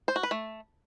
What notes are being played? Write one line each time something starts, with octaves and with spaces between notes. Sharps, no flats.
C5
F#4
B4
A3